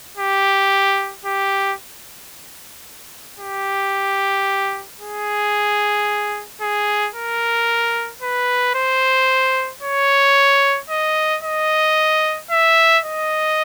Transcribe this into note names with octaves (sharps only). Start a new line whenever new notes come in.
G4
G4
G4
G#4
G#4
A#4
B4
C5
C#5
D#5
D#5
E5
D#5